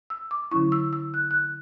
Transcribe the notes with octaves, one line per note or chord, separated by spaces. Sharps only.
E6
D6
D3 F#3 C#4 E4 C#6
E6
E6
F#6
F#6